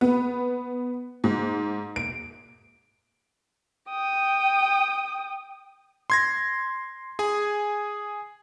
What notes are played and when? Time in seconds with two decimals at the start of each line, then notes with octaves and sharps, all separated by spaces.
0.01 B3
1.24 G#2
1.96 D7
3.89 G5 D#6
6.10 C6 G#6 A#6
7.19 G#4 G#5